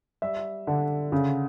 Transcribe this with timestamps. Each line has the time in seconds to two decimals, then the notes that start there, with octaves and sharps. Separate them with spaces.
0.22 G3 E5
0.67 D3
1.12 C#3